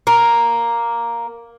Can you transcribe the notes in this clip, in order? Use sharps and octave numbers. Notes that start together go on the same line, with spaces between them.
A#3